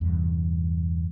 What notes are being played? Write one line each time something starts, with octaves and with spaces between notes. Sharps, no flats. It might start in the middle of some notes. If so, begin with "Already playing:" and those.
E2 G2 C3